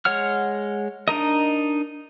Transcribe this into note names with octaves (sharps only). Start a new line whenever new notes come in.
G#3 C#5 F#5 F6
D4 D#4 A#4 D#5